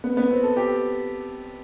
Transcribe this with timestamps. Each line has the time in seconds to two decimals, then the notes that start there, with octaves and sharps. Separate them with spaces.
0.04 B3
0.17 B3
0.30 C4
0.43 A4
0.57 G4